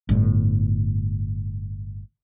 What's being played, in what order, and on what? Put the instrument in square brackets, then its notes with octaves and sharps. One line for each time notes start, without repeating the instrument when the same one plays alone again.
[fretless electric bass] G1 A2